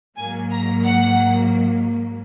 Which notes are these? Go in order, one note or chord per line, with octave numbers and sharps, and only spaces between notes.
G#2 F#3 A#3 G#5
A#5
F#5